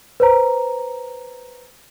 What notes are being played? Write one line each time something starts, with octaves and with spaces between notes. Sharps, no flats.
B4 C5 A#5